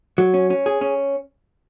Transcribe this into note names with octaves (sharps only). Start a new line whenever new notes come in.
F#3
C#4
C#4
G#4
C#4